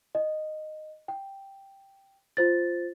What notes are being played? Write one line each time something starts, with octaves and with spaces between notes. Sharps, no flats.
D#5
G5
F4 C5 A6